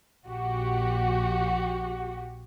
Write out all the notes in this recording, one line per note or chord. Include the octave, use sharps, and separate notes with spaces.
A#1 F#4 G4